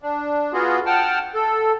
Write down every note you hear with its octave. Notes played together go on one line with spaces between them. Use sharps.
D4
B3 F4 F#4 G#4
F#5 G5 A5 F6
A4